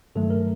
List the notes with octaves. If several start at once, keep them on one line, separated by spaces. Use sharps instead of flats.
G2 D#3 F#3 A3 A4
A#4